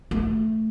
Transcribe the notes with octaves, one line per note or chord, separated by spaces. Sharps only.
A3